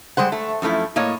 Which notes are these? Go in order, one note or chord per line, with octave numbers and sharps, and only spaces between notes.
G3 G#3 C5 F#5
A3
F#2 F3 A3 E4
A2 A#3 C#5 D#5